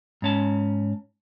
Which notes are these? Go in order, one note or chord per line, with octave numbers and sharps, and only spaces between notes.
G#2 C#4 A5